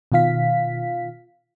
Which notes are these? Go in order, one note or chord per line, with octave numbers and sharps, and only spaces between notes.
B2 D#3 F4 F5 B6